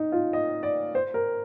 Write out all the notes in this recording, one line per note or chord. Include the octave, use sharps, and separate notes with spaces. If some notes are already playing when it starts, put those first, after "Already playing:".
Already playing: D#4
F4
D#5
D5
C5
A#4